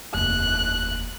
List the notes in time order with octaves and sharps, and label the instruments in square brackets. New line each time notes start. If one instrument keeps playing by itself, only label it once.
[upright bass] F1 D#2 [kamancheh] F#6